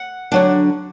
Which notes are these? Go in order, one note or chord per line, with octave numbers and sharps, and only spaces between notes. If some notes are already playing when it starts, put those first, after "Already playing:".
Already playing: F#5
D3 F#3 D4